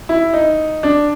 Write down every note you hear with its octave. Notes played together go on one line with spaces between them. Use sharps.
E4
D#4
D4